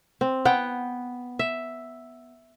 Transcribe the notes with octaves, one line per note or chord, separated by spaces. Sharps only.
C4
B3 F#5 G5
E5